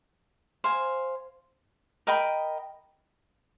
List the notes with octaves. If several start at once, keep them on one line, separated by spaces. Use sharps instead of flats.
C5 F5 G#5
A#4 D#5 G5 B5